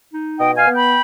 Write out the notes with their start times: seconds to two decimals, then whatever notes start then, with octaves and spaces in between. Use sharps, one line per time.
0.12 D#4
0.38 B2 D#5 G5
0.57 F5 G#5
0.66 B3
0.76 G5 B5